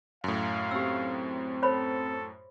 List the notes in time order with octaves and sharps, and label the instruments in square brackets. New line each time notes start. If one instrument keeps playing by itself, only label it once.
[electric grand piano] F#2 A2 [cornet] F5
[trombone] C4 [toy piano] G4 E6
[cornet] A4 [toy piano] C5 C#5 B5